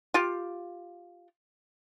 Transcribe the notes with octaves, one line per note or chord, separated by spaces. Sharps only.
F4 G4